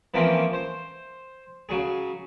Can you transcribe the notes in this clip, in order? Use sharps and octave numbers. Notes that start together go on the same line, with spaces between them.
E3 F3 A#3 C4 C#4
C5
C#3 F#3 G#4